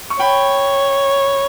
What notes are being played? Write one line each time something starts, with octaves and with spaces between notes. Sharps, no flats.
C#6
C#5 G5 B5